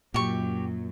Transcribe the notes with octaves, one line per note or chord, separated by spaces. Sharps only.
F#2 A#2 F#3 G4 C#6